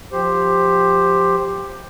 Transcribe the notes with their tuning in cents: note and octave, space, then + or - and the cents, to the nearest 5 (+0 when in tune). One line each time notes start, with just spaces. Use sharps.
F3 +30 G4 +10 C5 +0